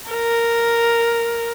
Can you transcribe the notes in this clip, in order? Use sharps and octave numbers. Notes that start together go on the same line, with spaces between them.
A#4